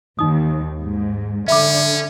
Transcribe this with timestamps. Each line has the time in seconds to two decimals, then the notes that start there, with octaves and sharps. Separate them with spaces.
0.19 D#2 D#4 D#6
0.80 G#2
1.48 D3 C#4 E5 B5 D6